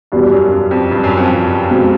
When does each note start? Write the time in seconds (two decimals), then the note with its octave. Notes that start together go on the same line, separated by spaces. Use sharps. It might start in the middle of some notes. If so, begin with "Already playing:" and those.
0.12 E2 G2 B2 G3
0.32 F#2
0.51 F#2
0.71 F2
0.91 G2
1.04 F#2
1.17 F2
1.30 F#2
1.70 B2 G#3 C4